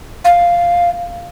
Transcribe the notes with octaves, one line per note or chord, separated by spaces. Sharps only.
F5